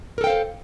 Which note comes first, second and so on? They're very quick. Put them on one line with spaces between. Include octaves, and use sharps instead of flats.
A#4 A4 G5 F5 C5